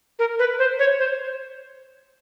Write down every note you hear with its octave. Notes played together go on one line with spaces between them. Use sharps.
A#4
B4
C5
C#5
C5